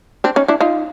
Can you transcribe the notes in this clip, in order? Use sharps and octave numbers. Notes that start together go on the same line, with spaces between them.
C4 D4
C#4 D#4
D4 E4
D#4 F4